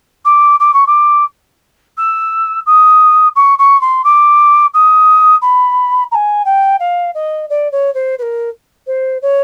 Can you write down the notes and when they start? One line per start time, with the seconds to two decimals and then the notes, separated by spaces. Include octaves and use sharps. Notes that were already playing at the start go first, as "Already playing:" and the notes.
0.25 D6
0.60 D6
0.74 C#6
0.87 D6
1.98 E6
2.66 D#6
3.36 C#6
3.59 C#6
3.81 C6
4.04 D6
4.74 D#6
5.42 B5
6.11 A#5
6.15 G#5
6.45 G5
6.80 F5
7.14 D#5
7.50 D5
7.72 C#5
7.94 C5
8.18 B4
8.22 A#4
8.87 C5
9.22 C#5